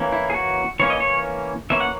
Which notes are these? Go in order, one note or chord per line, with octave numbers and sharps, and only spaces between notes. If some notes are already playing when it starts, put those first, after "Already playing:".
Already playing: E3 A#3 C#4
E4
G#4
F#4
E3 A#3 C#4 C#5
D#5
C#5
E3 A#3 C#4 E5
F#5